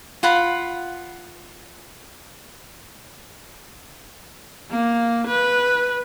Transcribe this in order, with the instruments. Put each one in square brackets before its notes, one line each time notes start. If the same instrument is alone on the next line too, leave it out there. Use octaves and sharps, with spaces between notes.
[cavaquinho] F4 F#5 B5
[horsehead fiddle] A#3
B4